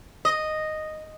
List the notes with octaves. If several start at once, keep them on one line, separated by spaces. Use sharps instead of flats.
D#5